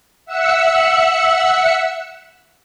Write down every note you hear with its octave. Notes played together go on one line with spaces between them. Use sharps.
E5 F#5 E6 F#6 C#7